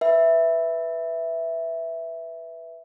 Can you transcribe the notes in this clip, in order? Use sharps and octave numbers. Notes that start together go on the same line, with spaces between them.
B4 E5